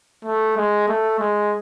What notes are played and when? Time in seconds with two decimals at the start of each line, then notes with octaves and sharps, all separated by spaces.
0.25 A3
0.57 G#3
0.88 A3
1.20 G#3